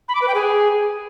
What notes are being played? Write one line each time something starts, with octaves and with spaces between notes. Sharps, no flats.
B5
D6
B4
G5
G#4